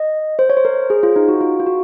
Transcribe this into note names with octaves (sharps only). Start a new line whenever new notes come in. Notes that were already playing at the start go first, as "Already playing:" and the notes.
Already playing: D#5
C5
C#5
C5
A#4
G#4
F4
D#4
F#4
F4
F4
F#4